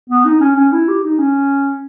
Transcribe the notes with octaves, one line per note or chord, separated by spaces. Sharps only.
B3
D#4
C#4
C#4
E4
G4
D#4
C#4